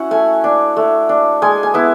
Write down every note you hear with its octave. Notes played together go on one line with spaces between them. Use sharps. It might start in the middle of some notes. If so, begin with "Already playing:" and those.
Already playing: C#4 E4 F#4 F#5
A3 G#5
D4
A3
D4
G#3 G#5
G#5
B3 E4